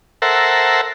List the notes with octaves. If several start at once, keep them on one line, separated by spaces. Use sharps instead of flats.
A4 A#4 C5 E5 F#5